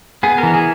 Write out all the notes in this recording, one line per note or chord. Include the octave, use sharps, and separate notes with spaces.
B3 G#4
A#4
E3
G#4